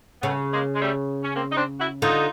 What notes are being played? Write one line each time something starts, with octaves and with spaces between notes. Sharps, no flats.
C#3 A3 B3
G#3 A#3
G#3
G3 A3
C#4
A#3 C4
D#4
C4 D4
E4 F#4
D3 D#4 F4